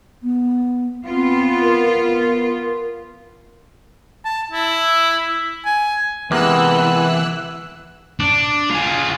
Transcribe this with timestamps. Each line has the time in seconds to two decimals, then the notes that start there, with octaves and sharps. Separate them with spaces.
0.23 B3
1.06 B3 C4 F4
1.62 A#4
4.25 A5
4.52 E4
5.65 G#5
6.31 C3 E3 G#3 A#3 B3 E6 F#6
8.20 D4
8.70 F4 G#4